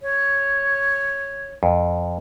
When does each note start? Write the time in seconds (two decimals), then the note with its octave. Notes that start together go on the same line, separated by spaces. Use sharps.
0.02 C#5
1.63 F2